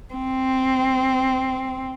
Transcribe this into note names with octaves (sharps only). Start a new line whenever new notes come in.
C4